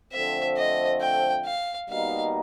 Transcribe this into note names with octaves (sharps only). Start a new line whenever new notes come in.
D3 F3 A3 C4 E5
D#5
G5
F5
B2 G3 A#3 D#4 F5